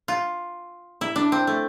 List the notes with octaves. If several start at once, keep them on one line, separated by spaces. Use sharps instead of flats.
F4
E4
D4
C4
A3